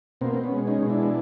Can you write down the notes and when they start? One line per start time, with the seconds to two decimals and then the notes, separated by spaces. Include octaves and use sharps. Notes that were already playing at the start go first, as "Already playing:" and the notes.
0.21 B2 A#3 C4
0.35 C4
0.44 B3 C#4
0.52 G#3
0.67 C#4 D#4
0.82 B2
0.90 D4 E4